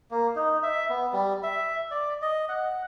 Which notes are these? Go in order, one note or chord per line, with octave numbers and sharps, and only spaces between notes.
A#3
D#4
E5
B3
G3
E5
D5
D#5
F#5